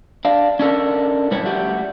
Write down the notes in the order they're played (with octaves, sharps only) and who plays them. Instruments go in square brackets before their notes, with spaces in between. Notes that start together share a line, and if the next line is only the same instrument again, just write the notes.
[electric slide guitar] D4 F5
C#4 D4 A4 A#4
A2 G3 D4 B4 C#5
G3 A3 F#4 G4